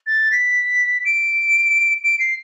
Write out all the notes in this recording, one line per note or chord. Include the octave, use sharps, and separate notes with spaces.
A6
B6
D7
D7
C7